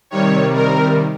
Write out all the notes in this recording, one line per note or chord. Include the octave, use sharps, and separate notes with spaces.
C3 D#3 G3 C#5
A#4